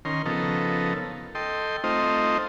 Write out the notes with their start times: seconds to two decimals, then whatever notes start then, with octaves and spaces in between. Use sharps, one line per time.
0.05 D#3 C#4 A#4 C6
0.26 C#3 F3 B3 D#4 A4 A#4
1.35 A4 D#5 G5 C6
1.84 A3 C4 D#4 F4 C5 D#5